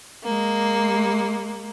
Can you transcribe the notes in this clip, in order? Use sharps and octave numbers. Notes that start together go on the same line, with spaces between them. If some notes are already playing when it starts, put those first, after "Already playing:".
G#3 A#3